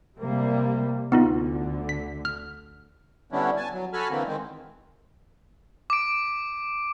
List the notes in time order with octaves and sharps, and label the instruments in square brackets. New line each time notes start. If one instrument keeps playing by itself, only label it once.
[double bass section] C3 G3 A#3
[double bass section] D2 D3 [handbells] B3 D#4 F4
[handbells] B6
F6
[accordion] D3 G3 B3 C#4 D4 E4
G#5 A5
F#3
F#4 A4 G#5 A5 B5 F6
D3 E3 A#3 C4
D#3 G#3 C4
[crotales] D6 D7